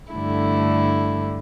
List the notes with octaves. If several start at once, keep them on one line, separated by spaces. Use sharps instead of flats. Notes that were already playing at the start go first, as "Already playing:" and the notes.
G2 D3 A3 E4